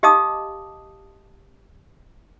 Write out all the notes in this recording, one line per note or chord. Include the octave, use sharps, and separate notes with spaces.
G4 D#5 F5 A5 D6 D#6